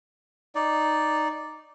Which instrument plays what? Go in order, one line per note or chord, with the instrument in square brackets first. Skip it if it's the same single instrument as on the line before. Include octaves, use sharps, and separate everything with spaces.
[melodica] D#4 D5